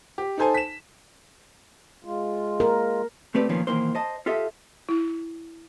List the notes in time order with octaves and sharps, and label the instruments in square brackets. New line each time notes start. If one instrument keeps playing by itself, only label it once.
[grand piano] G4
D#4 A4 C5 G#5 A5
B6 E7
[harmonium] G#3 F4
[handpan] A#4
[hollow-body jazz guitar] C2 A3 C4 G4 B4 D5
A#2 D#3 F3 B3 C#4 F4
B1 D#3 E3 A#3 C5
C5 D#5 A5
F4 G4 A4 D#5 E5
[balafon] E4